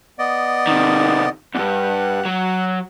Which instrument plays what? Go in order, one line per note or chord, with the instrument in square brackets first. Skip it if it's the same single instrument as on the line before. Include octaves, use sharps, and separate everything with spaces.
[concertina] B3 D5 D#5
[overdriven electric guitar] C3 D#3
[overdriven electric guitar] E2 G2 [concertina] F#5
[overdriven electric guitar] F#3